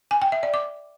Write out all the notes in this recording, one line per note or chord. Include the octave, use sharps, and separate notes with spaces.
G#5
G5
E5
D5
D6